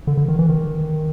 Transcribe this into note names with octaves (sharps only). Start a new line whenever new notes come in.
D3
D3
D#3
E3
D#3